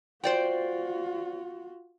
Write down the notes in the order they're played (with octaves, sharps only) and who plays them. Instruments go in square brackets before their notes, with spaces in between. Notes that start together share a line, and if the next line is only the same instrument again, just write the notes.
[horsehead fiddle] F4 F#4 [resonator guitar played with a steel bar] C5 D5 G5